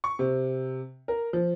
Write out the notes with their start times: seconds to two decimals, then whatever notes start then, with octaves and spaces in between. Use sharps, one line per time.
0.04 C#6
0.19 C3
1.08 A#4
1.33 F3